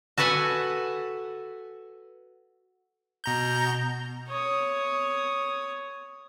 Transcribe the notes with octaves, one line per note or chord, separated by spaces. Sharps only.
F#4 A4 B4 F#5 G#5
B2 A#5 G6
C#5 D#6